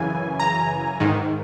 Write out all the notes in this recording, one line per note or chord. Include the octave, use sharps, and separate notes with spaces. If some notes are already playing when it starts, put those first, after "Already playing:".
Already playing: F#2 C#3 E3 G#5
A#5
G#2 D#3